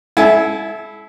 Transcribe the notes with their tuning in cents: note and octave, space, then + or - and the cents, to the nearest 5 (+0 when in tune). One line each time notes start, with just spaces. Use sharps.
E4 -10 A4 -40 G#5 +0